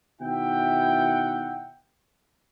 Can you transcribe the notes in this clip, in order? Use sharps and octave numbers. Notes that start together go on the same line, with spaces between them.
B2 D#3 E4 E5 F#5 G5